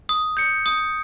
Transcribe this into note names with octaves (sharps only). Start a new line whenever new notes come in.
D#6
G6 C#7
D#6